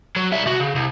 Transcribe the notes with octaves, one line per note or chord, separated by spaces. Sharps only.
F#3
G3 E5
C3 F#4
C#3
C2